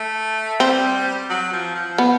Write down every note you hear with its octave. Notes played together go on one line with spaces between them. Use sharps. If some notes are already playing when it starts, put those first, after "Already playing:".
Already playing: A3
G3 C4
F#3
F3
F3
B3